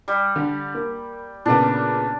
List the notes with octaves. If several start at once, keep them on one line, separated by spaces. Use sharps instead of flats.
G3
D3
A#3
A#2 C#3 B3 D4